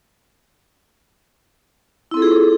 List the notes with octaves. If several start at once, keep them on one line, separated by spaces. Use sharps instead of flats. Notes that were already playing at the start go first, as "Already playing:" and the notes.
C4 E4 F4 G#4 A4